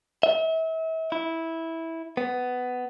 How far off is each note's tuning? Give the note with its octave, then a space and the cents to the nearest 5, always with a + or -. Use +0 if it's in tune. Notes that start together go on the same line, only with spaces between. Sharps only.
E5 -35
E4 -10
B3 +15